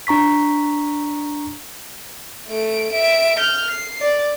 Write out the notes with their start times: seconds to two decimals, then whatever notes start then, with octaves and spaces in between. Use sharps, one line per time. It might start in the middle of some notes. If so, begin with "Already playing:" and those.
0.07 D4 A#5 C#6 B6
2.48 A3 D7
2.92 E5 D7
3.38 F6 G6
3.71 C7
4.01 D5